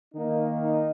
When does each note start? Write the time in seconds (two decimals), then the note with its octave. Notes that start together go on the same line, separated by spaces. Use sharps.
0.13 D#3 A#3 D#4
0.60 D#4